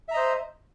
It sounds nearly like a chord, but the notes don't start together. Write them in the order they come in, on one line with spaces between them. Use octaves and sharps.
E5 A#5 D#5 C5